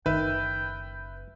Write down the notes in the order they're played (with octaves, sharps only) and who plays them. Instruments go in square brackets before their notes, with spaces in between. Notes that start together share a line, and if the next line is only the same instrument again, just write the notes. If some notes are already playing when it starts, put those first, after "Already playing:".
[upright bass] F#1 E4 [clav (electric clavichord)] D#3 [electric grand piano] B4 E5 [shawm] G5